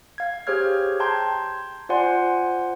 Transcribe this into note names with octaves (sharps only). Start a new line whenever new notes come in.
F5 G#6
G4 G#4 C5 C#5 F6 G#6
G5 A5 A#5 C6 G6 G#6
F4 C5 D5 F#5 G#5 C6